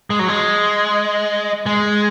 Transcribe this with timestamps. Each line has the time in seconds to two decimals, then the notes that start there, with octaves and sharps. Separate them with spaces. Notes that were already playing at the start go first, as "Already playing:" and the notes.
0.10 G#3
0.19 F#3
0.28 G#3
1.66 G#3